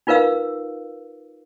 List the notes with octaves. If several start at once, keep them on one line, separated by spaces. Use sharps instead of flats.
D#4 F4 A#4 B4 F5 E6